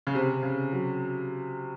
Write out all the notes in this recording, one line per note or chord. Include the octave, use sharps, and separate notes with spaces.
C#3
C3
C#3
F#3